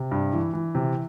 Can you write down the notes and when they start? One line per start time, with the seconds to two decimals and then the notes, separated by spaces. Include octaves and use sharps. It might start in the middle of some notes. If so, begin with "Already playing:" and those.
Already playing: C3
0.11 G2
0.33 E3
0.53 E3
0.75 C3